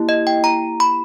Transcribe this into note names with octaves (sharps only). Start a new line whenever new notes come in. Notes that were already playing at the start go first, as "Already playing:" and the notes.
Already playing: A#3 E4 G4
D#5
G5
A#5
B5